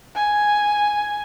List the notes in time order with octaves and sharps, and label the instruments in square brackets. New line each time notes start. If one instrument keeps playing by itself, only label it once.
[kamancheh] G#5